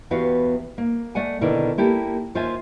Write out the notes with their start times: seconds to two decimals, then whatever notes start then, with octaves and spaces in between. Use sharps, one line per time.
0.11 E2 E3 B3 F#4 G4 F5
0.78 A#3
1.15 A3 D5 F#5 G#5
1.41 B2 D3 D#3 E4 D5
1.78 A#3 E4 G4 A4
2.35 D#2 F4 C5 E5 G#5